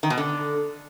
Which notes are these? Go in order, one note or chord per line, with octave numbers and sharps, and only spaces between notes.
D#3
B2
D3